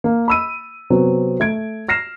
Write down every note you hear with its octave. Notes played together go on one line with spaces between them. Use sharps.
A#3
B5 E6 D#7
C3 F#3 B3 C4
A3 G#6 D7
F6 A#6 C7 E7